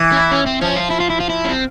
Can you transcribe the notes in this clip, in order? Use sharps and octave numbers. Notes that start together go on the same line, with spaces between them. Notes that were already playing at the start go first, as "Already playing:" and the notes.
Already playing: E3
C#4
E4
C#4
C4
F3 C#4
F4
E4
F4
E4
F4
E4
C#4
C4